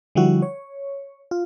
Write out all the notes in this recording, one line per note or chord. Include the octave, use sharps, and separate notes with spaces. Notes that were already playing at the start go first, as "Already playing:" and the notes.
D3 F3 G3 E4 F#4
C#5
F4